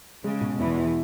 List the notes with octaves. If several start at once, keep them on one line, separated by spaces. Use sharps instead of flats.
C#3 G#3
B2
E2 E3 E4
E4